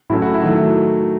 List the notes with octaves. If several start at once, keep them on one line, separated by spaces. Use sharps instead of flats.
A2 F#3 A3 C#4 E4
F#4
E4
D#3 F#3 A3